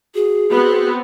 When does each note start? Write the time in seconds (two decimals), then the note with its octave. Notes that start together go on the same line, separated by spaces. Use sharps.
0.15 F#4 G#4
0.49 B3 C4 F#4